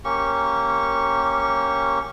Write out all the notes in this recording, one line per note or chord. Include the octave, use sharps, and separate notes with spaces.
A#3 C#4 G4 C#6